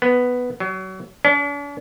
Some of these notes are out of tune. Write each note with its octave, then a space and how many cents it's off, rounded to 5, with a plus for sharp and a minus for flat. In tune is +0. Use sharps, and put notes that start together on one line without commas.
B3 +5
F#3 +30
D4 -45